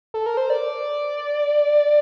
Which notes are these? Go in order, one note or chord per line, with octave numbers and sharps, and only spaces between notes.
A4
A#4
C5
D5